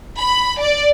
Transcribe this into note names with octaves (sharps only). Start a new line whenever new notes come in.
B5
D5